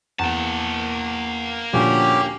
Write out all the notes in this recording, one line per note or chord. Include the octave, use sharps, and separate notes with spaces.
E2 A#3 A5
D2 A#2 F3 C#4 G4